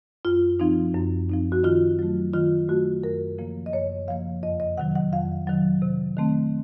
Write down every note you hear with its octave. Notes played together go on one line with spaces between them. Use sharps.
F#2 F4
F3 C4 D#4
F#2
F3 C4 D#4
F#4
D#3 F4
F#3 A3
D#3 F4
F#3 A3 F#4
F#2 A#4
C#3 F3 A#3
D#5
F#2 C#5
C#3 F3 A#3 F5
F2 D#5
D#5
C3 D#3 F#3 F#5
F#5
F2 F5
C3 D#3 F#3
C3
D#3 A3 C4